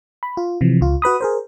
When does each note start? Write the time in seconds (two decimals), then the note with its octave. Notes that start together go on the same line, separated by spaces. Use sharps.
0.23 B5
0.37 F4
0.61 C3 E3 F3
0.81 C#2 F4
1.02 F#4 B4 B5 D#6
1.21 G#4 A#4 C5